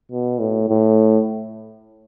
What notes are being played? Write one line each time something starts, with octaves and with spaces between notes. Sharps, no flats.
B2
A2
A2